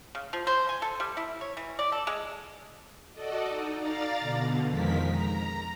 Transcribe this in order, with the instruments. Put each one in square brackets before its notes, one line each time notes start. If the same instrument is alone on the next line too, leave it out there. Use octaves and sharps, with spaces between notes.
[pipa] C#3
F3
C5
G#5
A4
G3
E4
C#5
E3
D5
A4
G#3
[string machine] F#4 A4 D5 D#5
D#4
D5 F5 A#5 A6
B2 D3
F2 D#3 F3 G#3 A#4 B6
A#5